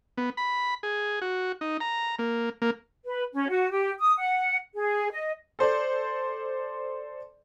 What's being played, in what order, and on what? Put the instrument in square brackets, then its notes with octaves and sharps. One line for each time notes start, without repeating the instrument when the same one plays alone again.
[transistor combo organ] B3
B5
G#4
F#4
D#4
A#5
A#3
A#3
[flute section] B4
C#4
F#4
G4
D#6
F#5
G#4
D#5
[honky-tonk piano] A4 C5 D5